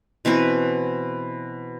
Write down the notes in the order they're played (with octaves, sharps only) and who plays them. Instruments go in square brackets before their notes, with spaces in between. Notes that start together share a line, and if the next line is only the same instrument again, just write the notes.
[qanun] B2 E3 C4 B4